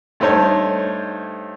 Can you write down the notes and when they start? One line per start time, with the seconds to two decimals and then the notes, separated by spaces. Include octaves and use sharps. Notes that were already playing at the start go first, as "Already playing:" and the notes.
0.20 G2 A3 D#4 C5 C#5 A5